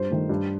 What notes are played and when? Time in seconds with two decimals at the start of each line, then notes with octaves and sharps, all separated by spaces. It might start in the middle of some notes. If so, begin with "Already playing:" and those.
Already playing: G2 C5
0.10 D#3 A3
0.29 G2